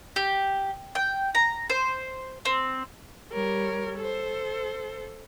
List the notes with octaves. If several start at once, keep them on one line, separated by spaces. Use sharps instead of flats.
G4
G5
A#5
C5
C4
G3 G4 A#4 C#5
A4 C5